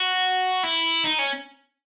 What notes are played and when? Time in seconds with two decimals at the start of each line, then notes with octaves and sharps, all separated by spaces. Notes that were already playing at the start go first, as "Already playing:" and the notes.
Already playing: F#4
0.63 E4
1.04 D#4
1.19 C#4